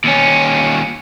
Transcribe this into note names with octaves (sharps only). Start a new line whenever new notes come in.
D#2 C#4